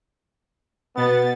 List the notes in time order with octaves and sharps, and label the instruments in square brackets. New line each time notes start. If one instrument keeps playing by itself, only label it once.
[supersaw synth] B2 A6 [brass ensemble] B3